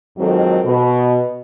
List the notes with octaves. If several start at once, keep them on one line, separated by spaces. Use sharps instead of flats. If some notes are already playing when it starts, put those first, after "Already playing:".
F2 G#2 D#3 F#3 C4 A4
B2